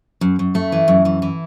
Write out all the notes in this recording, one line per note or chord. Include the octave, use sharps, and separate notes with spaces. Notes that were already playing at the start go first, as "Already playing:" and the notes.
F#2
F#2
A3
E3
F#2
E3
E3